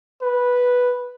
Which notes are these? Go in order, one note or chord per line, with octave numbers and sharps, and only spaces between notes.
B4